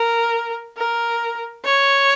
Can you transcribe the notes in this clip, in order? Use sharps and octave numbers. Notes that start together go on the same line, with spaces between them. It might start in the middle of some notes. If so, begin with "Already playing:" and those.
Already playing: A#4
A#4
C#5